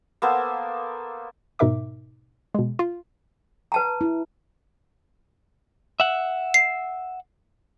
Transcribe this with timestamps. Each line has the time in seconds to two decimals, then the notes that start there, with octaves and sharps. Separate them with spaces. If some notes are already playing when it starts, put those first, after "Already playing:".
0.22 A#3 B3 A4 C5
1.59 G#2 B2 D#4 A#4 E5 D6
2.55 B2 G#3
2.79 F4
3.72 B4 A5 A#5
4.01 E4
6.00 E5 F#5
6.54 C7